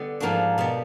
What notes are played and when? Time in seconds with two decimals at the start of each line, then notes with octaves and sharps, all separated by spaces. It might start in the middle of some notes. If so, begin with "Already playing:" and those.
Already playing: D3 G3 B3
0.20 G#2 F3 A#3 D4 F#4
0.58 B2 G3 B3